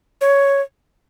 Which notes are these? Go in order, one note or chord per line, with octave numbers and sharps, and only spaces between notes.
C#5